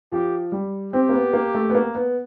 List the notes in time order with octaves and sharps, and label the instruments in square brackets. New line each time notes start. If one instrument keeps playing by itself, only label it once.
[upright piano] F3 [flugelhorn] G4
[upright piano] G3
[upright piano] C4 [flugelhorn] G4
[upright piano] A#3
B3
A#3
A3
B3
A#3
B3